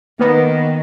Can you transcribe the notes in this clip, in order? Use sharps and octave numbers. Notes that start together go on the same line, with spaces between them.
D#3 A#3 B3